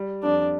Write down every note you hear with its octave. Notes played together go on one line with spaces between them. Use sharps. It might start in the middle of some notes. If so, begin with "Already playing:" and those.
Already playing: G3
F2 D4